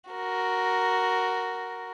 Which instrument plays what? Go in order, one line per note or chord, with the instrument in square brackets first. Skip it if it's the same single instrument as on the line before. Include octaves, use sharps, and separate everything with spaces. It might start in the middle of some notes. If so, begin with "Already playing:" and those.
[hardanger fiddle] F#4 A#4